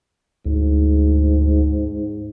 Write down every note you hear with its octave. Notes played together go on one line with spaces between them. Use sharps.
D2 G#2